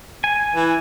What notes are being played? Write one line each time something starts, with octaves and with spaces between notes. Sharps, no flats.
G#5
E3